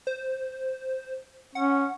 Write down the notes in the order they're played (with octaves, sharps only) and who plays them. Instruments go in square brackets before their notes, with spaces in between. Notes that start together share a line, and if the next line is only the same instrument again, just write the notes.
[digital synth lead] C5
[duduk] C#4 [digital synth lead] F#5